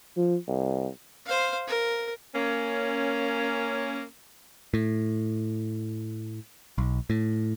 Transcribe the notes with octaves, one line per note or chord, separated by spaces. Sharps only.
F3
C2
C5 F5
A#4
A#3 C#4
A2
B1
A2